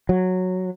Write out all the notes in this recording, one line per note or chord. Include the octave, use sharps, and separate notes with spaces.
F#3